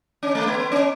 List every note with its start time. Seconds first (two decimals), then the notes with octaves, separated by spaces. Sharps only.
0.23 C#4
0.35 A3
0.47 B3
0.59 B3
0.72 C#4